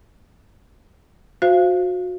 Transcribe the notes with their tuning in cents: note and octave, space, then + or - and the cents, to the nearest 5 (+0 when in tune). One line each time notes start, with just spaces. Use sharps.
F#4 -30 C5 +0 F5 -20